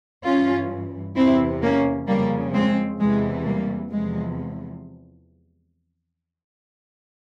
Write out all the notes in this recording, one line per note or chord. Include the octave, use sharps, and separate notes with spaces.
G2 E3 C#4 F4
E2 C3 E3 C4 E4
A#3 C#4
F2 C#3 F3 G3 A#3
G#3 C4
E2 C3 E3 G#3
G3 A#3
E2 C3 F3 G#3